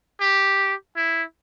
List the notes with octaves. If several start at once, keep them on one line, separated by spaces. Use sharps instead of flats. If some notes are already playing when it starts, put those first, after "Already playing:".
G4
E4